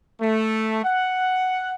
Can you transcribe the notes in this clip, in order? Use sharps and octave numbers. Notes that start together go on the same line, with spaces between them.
A3
F#5